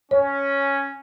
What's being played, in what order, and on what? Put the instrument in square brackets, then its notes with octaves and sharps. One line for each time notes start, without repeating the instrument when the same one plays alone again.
[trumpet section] C#4 [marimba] C#5